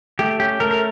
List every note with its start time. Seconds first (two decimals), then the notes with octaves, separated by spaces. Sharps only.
0.19 A3 G4
0.39 C#4 G4
0.60 A3 A#4
0.71 A#4